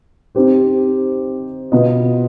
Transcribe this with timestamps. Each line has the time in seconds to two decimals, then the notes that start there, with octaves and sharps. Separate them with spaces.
0.35 C4 D#4 G4 C5
1.72 B2 B3 F4 B4 D#5